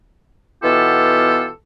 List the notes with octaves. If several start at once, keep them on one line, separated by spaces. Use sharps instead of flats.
B2 E3 B3 F4 G4 A4